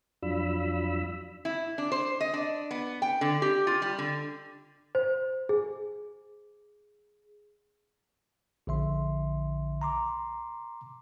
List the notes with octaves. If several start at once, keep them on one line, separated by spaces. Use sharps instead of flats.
F2 F#3 D4 F4 B5 E6
E4
D4
C5
D#5
D4
B3
G5
D3
G4
F4
G3
D3
C5
G#4
A#1 D3 E5 C6
A#5 C6 D6